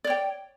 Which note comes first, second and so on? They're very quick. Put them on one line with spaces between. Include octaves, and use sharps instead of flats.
D5 C#5 G5